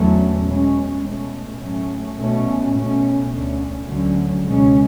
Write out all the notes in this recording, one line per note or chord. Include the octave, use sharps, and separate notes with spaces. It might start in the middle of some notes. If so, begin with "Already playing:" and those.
Already playing: E2 D3 F#3 A3 C#4
B2 G#3 C#4
B2 A3 C#4
A2 F#3 A3 C#4
B2 A3 C#4
B2 A3 C#4
D2 D3 A3 C#4
D2 D3 F#3 C#4
C#2 B2 G#3 C#4